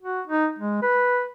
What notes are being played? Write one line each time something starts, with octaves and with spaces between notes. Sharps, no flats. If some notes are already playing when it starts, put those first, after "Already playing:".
F#4
D#4
G#3
B4